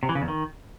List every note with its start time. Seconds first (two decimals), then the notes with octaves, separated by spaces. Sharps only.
0.03 C3
0.09 E3
0.15 C#3
0.22 E2
0.28 D#3